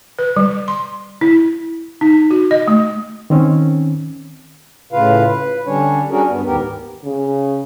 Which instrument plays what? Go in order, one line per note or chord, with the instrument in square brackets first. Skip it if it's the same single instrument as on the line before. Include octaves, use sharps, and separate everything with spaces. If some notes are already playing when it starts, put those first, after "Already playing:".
[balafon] B4
G3
C6
E4
D#4
F#4
D#5
A3
[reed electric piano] D#3 C4 C#4
[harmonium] A2 C#3 F4 B4 F5
B4
D3 G3 C#4 D4 C#5
G3 C#4 D4 F#4 G#4 A#4
G2 B3
D#2 G#2 B3 G4 A#4
[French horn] C#3